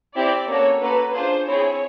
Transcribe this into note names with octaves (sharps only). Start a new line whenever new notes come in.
C4 E4 G4 D5
A#3 C#4 F#4 A4 C#5
A#3 C#4 F#4 A4 B4
D4 F4 G#4 C5
C4 E4 G#4 C#5